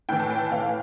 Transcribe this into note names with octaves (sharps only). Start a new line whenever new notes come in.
A2 E3 G5
A5
G5
A2 E3 F5